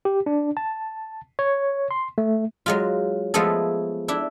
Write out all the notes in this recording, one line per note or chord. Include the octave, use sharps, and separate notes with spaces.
G4
D4
A5
C#5
C6
A3
F#3 G#3 F4
F3 G#3 A3 B3 G#4 A4
D4 E4